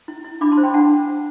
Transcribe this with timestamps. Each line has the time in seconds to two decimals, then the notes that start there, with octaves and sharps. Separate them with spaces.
0.08 E4
0.25 E4
0.41 D4 B5 D6
0.52 A5 C6
0.57 C5
0.63 G5 B5
0.73 D4 F#5 A5